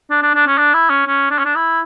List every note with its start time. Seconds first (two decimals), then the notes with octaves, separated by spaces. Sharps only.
0.10 D4
0.22 D4
0.35 D4
0.47 C#4
0.58 D4
0.74 E4
0.90 C#4
1.07 C#4
1.30 D4
1.38 C#4
1.45 D4
1.55 E4